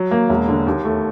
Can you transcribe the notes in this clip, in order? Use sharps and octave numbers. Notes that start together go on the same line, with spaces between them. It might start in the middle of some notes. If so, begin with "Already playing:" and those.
Already playing: F#3
A#3
E1
D3
D#2
A3